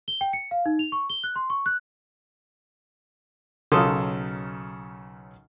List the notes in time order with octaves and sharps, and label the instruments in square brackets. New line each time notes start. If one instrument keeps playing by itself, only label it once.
[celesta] G7
G5
C#7
F5
D#4
F7
C#6
G7
F#6
C6
C#6
F#6
[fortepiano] B1 C#3 A4 A#4 C6 D#6